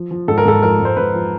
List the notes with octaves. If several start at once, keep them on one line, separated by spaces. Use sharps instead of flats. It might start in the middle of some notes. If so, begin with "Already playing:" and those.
Already playing: F3
F3
G#2 A4
A#4
G#2 A4
F3 A#4
G#2
C5
G#2 B4
F3